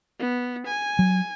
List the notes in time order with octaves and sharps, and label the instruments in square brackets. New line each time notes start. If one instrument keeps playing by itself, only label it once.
[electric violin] B3
G#5
[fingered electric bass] F#3